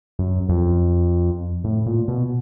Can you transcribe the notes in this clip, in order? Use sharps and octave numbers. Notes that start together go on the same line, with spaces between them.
F#2
F2
A2
A#2
B2